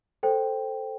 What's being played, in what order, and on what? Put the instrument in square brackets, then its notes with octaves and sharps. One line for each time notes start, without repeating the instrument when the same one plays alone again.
[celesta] A4 C5 G5